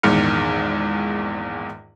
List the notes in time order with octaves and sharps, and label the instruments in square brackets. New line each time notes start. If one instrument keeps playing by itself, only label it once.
[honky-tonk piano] A#1 E2 G#2 D#3 F6 C#7